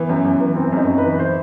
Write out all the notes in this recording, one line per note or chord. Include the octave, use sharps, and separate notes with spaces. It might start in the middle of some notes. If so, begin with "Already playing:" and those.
Already playing: E3 B3
F#2
F#2
E3
E3 C4
F#2 D#4
F#2
B4
E3
E3 C5